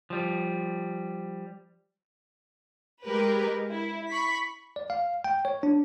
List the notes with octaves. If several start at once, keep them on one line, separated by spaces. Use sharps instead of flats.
F3 G3
G#3 G4 A#4 B4
E4
B5 C#6 B6
D5
F5
G5
C#5
D4